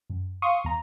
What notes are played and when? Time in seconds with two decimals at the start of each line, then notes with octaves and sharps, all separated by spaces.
0.10 F#2
0.42 F5 C6 C#6 D#6
0.64 E2 A#5